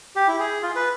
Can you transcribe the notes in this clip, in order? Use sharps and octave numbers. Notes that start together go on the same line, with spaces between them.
G4
E4
G#4
F4
B4